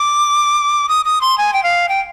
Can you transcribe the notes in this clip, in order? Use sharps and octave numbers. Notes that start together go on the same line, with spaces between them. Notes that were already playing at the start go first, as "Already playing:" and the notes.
Already playing: D6
D#6
D#6
C6
G#5
G5
F5
G5